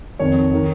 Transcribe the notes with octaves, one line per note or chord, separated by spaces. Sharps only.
F2 D#3 C#5
D#3